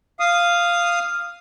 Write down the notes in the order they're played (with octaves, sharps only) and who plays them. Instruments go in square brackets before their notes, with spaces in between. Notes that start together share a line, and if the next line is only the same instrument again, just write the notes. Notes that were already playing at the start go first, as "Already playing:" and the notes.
[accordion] F5 D#6